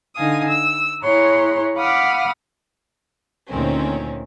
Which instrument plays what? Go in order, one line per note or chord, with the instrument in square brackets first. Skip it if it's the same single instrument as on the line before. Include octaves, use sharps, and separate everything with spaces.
[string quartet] D3 D#4 F5 G#5 D#6
E6
E4 G#4 C#5 F#5 A#5 C6
F5 F#5 B5 D6 D#6 F6
[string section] D2 A#2 D#3 C4 C#4